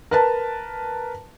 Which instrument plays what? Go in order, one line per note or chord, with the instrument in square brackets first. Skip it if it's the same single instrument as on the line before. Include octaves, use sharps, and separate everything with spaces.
[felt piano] A#4 B4 A5